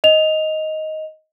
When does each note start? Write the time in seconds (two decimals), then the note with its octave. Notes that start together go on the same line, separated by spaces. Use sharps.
0.04 D#5 F7